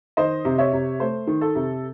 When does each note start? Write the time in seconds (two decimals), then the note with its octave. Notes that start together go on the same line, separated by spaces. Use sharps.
0.17 D#3 C5 D#5
0.45 C3
0.58 C#5 E5
0.73 C3
1.00 A3 C5
1.27 D#3
1.41 A4
1.55 C3